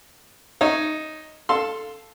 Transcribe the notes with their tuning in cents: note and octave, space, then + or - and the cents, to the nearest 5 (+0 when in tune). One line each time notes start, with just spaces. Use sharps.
D#4 +0 C#5 +0 E5 +10
A4 +0 F5 +5 C6 +0